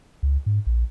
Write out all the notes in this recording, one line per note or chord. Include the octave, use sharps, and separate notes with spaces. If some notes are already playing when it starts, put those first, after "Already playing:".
C#2
G#2
A#1